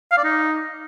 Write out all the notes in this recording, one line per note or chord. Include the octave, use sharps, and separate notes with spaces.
F5
D5
D#4